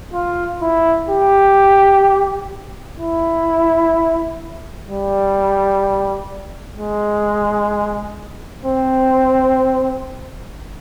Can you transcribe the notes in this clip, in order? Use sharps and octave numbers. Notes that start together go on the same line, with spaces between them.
F4
E4
G4
E4
G3
G#3
C4